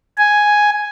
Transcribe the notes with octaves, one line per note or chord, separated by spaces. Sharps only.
G#5